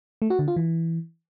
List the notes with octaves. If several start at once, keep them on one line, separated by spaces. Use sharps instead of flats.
A3
F#4
D3
F4
E3